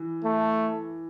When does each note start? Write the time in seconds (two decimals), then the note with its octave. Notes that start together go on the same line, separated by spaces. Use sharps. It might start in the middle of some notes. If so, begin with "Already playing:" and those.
Already playing: E3
0.24 A3